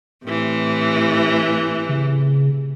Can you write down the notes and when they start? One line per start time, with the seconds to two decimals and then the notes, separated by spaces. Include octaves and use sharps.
0.25 A2 C3 E3
1.89 C#3